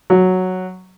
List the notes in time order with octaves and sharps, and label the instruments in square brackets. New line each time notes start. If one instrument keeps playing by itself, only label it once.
[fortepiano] F#3